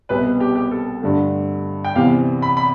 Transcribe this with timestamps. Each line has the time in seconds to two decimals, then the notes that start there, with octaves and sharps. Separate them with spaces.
0.09 C2 B2 B3 B4
0.40 G4
0.55 G4
0.71 A4
1.03 G2 D3 A3
1.85 G5
1.96 E2 C3 E3 F5
2.42 B5
2.57 B5